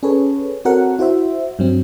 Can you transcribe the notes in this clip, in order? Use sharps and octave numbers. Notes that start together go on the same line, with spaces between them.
C#4 G#4 A4 B4 C#5
C4 F#4 A4 A#4 C#5 F#5
E4 F#4 C5 E5
G2 F#3 C4